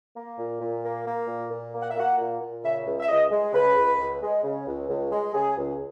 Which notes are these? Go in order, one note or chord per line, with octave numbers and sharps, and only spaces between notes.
A#3
A#2
A#2
A#3
A#3
A#2
A#2
A#3
F#5
E5
A#3 F#5
A#2
A#2
C#3 E5
C#2
E5
C#2 D#5
G#3
C#3 B4
C#2
C#2
G#3
C#3
C#2
C#2
G#3
C#3 G#4
C#2